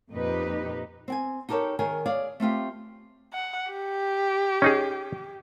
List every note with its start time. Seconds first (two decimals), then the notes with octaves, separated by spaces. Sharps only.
0.12 F2 A#2 D#4 G4 B4
1.08 C4 G5 G#5
1.49 D#4 G4 A4 A#4 C#5
1.79 D#3 G#4 A#4 C#5 G#5
2.06 G#4 C#5 D5 F5
2.40 A3 C4 F4 G4
3.33 F#5
3.72 G4
4.62 C#4 D#4 G#4